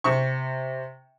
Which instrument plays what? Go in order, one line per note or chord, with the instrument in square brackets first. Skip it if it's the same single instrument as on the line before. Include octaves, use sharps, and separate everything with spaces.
[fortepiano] C3 C#6